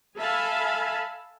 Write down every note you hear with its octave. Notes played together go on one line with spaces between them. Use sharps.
A4 E5 F5 G#5 A5 B5